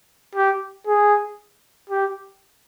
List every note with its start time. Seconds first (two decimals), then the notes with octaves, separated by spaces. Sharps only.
0.35 G4
0.87 G#4
1.90 G4